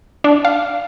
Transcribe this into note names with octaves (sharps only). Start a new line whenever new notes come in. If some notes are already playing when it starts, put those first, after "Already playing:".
D4
F5